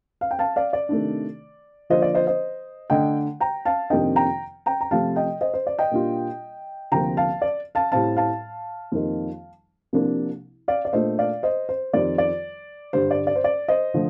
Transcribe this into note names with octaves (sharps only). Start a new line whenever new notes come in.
F5
G5
F5 A5
D5 F5
D5
C3 D#3 A3 D4
D3 F3 A#3 F4 C5 D#5
D5
C5 D#5
C5 D#5
D3 A3 D4 D#5 G5
G5 A#5
F5 A5
F2 C3 D#3 A#3 D4 D#5 G5
G5 A#5
G5 A#5
A#5
C3 F3 A3 F5 A5
D#5 G5
C5 D#5
C5
D5
D#5 G5
A#2 G3 D4 F4
D2 C3 F3 A#3 G5 A#5
F5 A5
D5
F5 A5
A2 G3 C4 F5 A5
F5 A5
F2 D#3 G3 A#3 D#4
C2 C3 F3 A#3 D4
D5 F5
D5
A#2 A3 D4 F4 C5 D#5
D5 F5
C5 D#5
C5
F2 D#3 G3 D5
D5
G2 D3 G3 C5
D5
D5
C5
D5
C5 D#5
D3 F3 A3